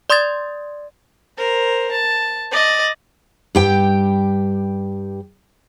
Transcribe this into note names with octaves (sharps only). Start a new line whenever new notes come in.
D5 C6 D#6 G#6 A6
A#4 C5
A5
D5 D#5
G2 G4 G5